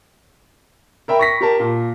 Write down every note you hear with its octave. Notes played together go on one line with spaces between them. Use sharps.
A#4 E5 G5 B5
C#6 A#6 B6
G4 A#4 A5
A#2